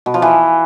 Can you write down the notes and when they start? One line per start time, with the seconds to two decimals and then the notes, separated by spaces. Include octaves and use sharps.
0.06 B2
0.14 F3
0.22 E3